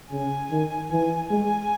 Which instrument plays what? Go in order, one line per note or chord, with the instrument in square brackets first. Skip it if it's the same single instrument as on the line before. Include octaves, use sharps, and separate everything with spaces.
[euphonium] C#3 [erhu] G#5
[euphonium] D#3
[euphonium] E3 [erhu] G#5
[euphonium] G#3 [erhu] G#5